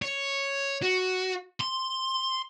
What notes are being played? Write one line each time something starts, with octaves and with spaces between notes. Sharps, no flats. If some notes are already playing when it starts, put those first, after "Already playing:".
C#5
F#4
C6